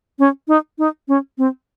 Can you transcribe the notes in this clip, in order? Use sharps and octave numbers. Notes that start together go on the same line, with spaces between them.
C#4
D#4
D#4
C#4
C4